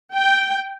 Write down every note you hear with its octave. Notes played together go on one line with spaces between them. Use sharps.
G5